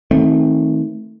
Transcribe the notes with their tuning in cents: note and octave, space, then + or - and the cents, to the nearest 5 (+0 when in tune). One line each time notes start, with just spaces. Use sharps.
D#3 +30 A3 +0 C4 +20